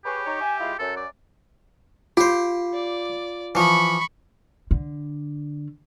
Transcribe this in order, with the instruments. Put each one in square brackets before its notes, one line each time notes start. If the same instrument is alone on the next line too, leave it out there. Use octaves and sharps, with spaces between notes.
[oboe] G4 [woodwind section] G#4 B4 C#5
[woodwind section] D#4 C#5
E5 G#5
G#3 E4 F4
[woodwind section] F#2 [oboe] A4
[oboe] D5
[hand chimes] F4 [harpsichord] G4 C5
[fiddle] D5
[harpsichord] E3 F3 [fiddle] B5 C#6
[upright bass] D3